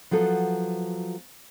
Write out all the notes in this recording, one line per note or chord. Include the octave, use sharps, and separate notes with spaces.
F3 F#3 B3 A4